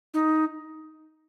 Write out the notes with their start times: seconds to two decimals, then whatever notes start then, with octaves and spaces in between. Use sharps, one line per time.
0.14 D#4